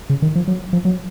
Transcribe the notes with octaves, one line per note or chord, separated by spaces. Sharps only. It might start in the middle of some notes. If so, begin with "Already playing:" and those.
C#3
D#3
F3
F#3
F3
F#3